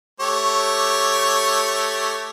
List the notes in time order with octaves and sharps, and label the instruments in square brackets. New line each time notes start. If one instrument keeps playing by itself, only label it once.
[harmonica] A3 G4 C#5